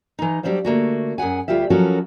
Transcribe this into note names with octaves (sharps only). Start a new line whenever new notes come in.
E3 D#4
F#3 G3 B3 D4 C5 F5
D3 A3 A#3 F#4
F#2 G#4 F#5 G#5
D2 G3 F4 G4 E5
F3 F#3 C#4 F#4 A4 A#4